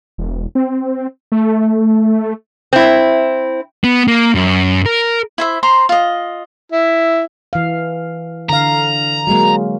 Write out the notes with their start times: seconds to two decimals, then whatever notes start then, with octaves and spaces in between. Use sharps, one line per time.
0.18 E1
0.55 C4
1.32 A3
2.73 C4 E4
3.84 B3
4.08 A#3
4.35 F#2
4.86 A#4
5.38 E4 C5 E5
5.63 C5 A#5 C6
5.89 F4 D#5
6.72 E4
7.53 E3 F5
8.50 D3 F5 A#5
9.27 F#3 G#3 A#3